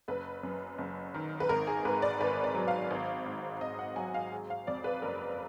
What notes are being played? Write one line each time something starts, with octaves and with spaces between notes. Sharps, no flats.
F#1 B4
F#2
F#1
D#3
B4
G#1 A#4
G#4
G#2 B4
D5
G#1 B4
D5
F#3
F5
G#1
G#2
G#1 D#5
F#5
F#3 G#5
F5
G#3
F5
F2 D5
B4
F#1 A#4